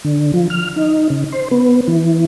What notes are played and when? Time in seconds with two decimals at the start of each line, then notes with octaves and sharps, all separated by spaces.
0.05 D3
0.34 F3
0.50 F6
0.76 D#4
1.10 C#3
1.32 C5
1.51 B3
1.88 E3